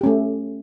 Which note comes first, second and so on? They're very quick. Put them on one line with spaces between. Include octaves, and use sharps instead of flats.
G4 C#4 A3